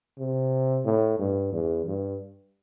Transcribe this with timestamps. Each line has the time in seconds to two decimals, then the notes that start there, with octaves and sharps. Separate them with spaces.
0.19 C3
0.85 A2
1.19 G2
1.53 E2
1.86 G2